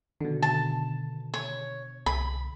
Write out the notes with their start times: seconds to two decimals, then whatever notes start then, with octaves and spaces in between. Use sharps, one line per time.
0.21 B2 D3 D#3
0.42 A5
1.34 C#5
2.06 C2 B5